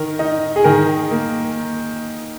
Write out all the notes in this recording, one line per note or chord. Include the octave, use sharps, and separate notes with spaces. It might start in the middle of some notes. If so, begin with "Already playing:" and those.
Already playing: D#3 A#4
D#4
G#4
D#3 A#4
A#3